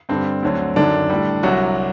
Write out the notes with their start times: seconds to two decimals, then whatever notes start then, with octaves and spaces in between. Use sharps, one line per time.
0.09 G2 D3 G3 C4
0.43 D2 D3 F#3
0.76 F#2 D3 D#3 F#3 D4
1.10 A2 G3
1.43 C2 C3 F#3 F#4